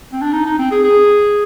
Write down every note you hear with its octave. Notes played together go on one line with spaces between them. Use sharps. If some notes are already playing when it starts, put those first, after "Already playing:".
C4
D4
D#4
D#4
C4
G#4
G#4